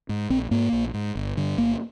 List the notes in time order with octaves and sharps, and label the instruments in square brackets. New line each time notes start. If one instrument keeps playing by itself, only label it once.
[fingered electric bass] G#2
A#1 C4
G#2 A#3
A#1
G#2
G1
G2 D3
G1 A#3